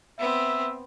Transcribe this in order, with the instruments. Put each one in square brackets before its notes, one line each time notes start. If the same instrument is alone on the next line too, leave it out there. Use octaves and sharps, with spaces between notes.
[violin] B3 C4 [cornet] E5